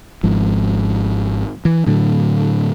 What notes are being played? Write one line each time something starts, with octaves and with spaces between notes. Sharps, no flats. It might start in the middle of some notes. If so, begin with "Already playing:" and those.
G#1 G#2 F3
E3
A2 D3 F#3